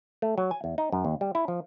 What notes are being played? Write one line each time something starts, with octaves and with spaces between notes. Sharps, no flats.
A3
F#3
G#5
E2
D#4
F#2
D#2
G3
E4
F3